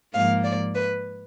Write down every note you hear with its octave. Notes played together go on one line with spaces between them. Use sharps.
G#2 F3 A#3 F5
D5
B4